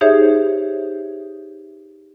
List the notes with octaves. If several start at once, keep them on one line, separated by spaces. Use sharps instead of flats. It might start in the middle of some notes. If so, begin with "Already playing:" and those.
D#4 G4 G#4 C5 C#5 E5